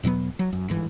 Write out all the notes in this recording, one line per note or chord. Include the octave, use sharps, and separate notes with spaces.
E2 B2 F#3 B3
F#3
F#2
G1 G#2 E3